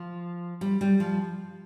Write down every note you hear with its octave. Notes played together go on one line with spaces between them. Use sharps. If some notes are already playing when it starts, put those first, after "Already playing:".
Already playing: F3
G3
G3
F3